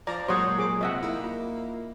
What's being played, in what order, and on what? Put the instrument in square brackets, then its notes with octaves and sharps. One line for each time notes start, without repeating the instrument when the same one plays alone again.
[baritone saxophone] F3 [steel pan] D5 A#5
[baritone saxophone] A#2 [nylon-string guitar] F#3 G#3 [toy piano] G4 D#6 [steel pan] C5 C#5 F#5
[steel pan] G#4 D6
[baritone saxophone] C3 [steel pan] D#5 E5 F#5
[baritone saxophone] A#3 [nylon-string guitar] D#4 E4
[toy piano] F4